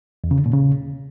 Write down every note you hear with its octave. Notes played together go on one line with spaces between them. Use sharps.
E2
C#3
D3
A#2
C#3